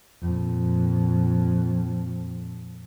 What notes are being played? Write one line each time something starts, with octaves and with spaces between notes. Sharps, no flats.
F2 A#2